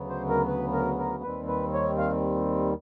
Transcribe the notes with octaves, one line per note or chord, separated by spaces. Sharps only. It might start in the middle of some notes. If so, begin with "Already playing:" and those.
Already playing: D2 C#3 F#3 B3
C5
A#4
B4
A#4
A#4
D#2 D#3 G3 C4 B4
B4
C#5
F5